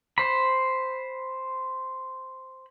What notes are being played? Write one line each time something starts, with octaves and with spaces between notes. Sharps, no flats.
C5 B5